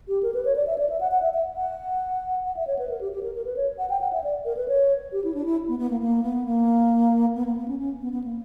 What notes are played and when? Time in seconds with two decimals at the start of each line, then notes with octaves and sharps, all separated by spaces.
0.08 G4
0.23 A#4
0.34 B4
0.45 C#5
0.56 D5
0.67 E5
0.78 D5
0.89 E5
1.01 F#5
1.11 F#5
1.23 E5
1.34 E5
1.56 F#5
2.45 F#5
2.57 E5
2.67 C#5
2.79 B4
2.89 A#4
3.01 G4
3.12 G4
3.23 A#4
3.34 A#4
3.45 B4
3.57 C#5
3.78 F#5
3.90 G5
4.01 F#5
4.13 E5
4.24 D5
4.45 A#4
4.57 B4
4.68 C#5
5.12 G4
5.24 E4
5.34 D4
5.46 E4
5.68 B3
5.79 B3
5.90 A#3
6.01 A#3
6.23 B3
6.46 A#3
7.35 B3
7.46 A#3
7.57 B3
7.68 C#4
7.79 C#4
8.01 B3
8.12 B3
8.24 A#3